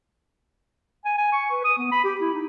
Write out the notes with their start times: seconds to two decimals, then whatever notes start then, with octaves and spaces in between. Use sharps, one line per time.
1.05 G#5
1.18 G#5
1.33 C#6
1.51 B4
1.64 D#6
1.78 B3
1.92 B5
2.04 G4
2.21 E4
2.34 D#4